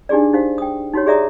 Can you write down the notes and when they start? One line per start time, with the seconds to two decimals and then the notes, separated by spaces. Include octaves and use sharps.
0.09 D4 D#4 G4 G#4 D5
0.33 D#4 G4 C5 F5
0.58 G5 D#6
0.94 D#4 F#4 G4 C#5
1.06 G4 G#4 D5 E5 A#5 D#6